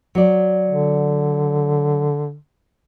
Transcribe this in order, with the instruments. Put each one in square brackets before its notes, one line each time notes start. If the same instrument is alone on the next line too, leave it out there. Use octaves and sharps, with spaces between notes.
[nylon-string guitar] F#3 D5
[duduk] D3